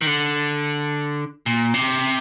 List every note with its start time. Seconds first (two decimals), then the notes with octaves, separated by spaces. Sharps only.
0.01 D#3
0.07 D3
1.46 A#2
1.74 C3